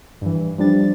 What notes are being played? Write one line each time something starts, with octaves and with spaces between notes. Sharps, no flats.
G2 E3
F3 G3 D4 A6